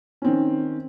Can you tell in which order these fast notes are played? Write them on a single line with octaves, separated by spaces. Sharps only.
C#4 C4 D#3